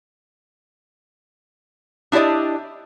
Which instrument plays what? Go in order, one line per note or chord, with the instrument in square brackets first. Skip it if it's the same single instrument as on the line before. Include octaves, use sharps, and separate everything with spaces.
[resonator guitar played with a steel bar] D4 E4 G4 D5 D#5